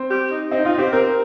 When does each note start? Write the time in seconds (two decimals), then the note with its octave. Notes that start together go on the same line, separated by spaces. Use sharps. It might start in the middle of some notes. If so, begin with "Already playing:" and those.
Already playing: C4
0.10 G4
0.31 D#4
0.51 C4 D#4
0.65 D#4 F4
0.78 C4 G4
0.93 C4 A#4